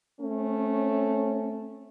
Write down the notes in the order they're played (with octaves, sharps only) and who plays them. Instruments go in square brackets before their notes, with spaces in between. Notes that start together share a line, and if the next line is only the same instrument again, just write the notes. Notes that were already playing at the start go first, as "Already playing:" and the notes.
[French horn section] A3 C4 C#4